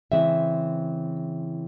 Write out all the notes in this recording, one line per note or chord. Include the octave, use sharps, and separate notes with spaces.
C#3 E3 G#3 C4 E5